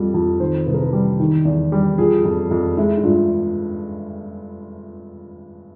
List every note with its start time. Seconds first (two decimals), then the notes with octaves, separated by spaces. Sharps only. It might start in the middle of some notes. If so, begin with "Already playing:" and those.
Already playing: F2 G3
0.14 F2
0.40 D#3 C5
0.66 C2 B4
0.74 A#4
0.82 B4
0.93 G3
1.19 D#3
1.45 E2
1.72 G3
1.98 F3 G#4
2.25 F2
2.51 F2
2.77 G#3 E4
2.98 E4
3.03 G2 F4